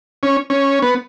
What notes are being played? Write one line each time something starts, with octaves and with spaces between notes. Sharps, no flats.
C#4
C#4
B3